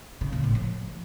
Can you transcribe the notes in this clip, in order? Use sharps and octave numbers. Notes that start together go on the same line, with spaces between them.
C#3
A#2
A2
F3